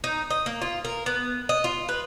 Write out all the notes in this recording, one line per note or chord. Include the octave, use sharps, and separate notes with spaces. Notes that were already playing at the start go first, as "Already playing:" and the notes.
D#4
D#5
A#3
F4
A#4
B3
D#5
F4
B4